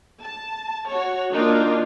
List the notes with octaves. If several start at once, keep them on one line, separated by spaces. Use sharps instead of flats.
A5
F#4 C#5
D#3 A#3 D4 D#4 F4